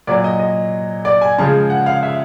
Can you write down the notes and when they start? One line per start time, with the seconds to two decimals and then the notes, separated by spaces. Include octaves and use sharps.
0.07 A#2 F#3 D5
0.24 D#5
0.39 D#5
1.05 D5
1.21 G#5
1.38 C#3 F3 G#3 A5
1.70 F#5
1.86 F5
2.03 E5